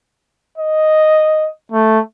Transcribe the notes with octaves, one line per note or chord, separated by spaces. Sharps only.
D#5
A3